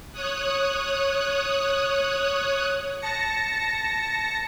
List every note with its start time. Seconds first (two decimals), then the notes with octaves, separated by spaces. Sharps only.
0.12 C#5 D#6 F#6
3.01 A5 A#6 C#7